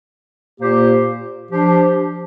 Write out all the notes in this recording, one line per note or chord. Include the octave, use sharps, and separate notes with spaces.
A#2 A#3 G4 C5
F3 D4 G4 C5